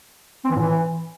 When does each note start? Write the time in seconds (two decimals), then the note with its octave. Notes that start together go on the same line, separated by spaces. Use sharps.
0.44 C4
0.50 E3
0.56 A2
0.61 E3